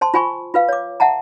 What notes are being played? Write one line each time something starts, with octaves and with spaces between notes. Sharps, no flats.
C5 A5 C6
F4 C5 G#5 B5 C#6
F4 B4 F5
C#5 D6
E5 F#5 A5 A#5